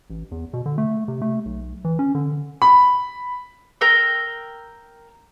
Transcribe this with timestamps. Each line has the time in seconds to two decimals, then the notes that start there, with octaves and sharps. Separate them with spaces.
0.10 A1
0.31 E2
0.53 B2
0.66 D3
0.78 A3
1.08 C3
1.22 A3
1.45 B1
1.85 E3
1.99 C#4
2.15 D3
2.62 B5
3.81 A#4 G5 E6